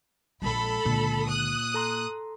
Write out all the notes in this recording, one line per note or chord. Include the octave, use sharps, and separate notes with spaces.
A#1 G#3 A4 B5
C#2 A#2 D3
D#6 F#6
A4 A#5 C6